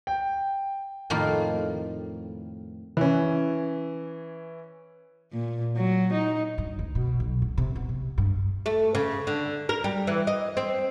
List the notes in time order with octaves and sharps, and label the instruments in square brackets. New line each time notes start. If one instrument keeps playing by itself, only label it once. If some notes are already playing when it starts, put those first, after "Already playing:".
[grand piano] G5
[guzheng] F2 A2 D#3 A#3 F4
[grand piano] E3 C#4
[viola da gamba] A#2
F#3
D#4
[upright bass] G2
D2
B2
B1
B2
C3
B3
C3
G2
[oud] A3
C#3
D3
A#4
G3
E3
D#5
C4